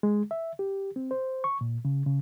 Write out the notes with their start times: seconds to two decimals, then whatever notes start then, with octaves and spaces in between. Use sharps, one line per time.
0.03 G#3
0.31 E5
0.59 G4
0.96 C4
1.11 C5
1.44 C#6
1.61 A#2
1.85 C#3
2.06 C#3